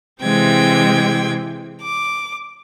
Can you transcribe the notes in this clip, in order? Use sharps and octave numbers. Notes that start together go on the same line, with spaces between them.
C3 E3 G#3 C4 G5 G#6
D6